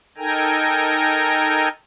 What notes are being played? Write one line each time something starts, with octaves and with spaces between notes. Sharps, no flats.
D#4 A4 A#4 G5 G#5 A#5